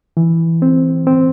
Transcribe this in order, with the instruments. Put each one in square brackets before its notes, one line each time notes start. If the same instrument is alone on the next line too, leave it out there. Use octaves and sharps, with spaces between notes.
[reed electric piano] E3
C4
C4